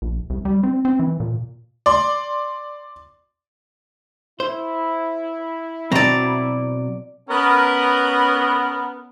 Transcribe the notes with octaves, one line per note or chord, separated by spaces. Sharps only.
A#1
C2
G3
C4
C4
E3
A#2
D5 C6
E4 C5
B2 F#3 C4 D5 A#5
B3 C#4 A#4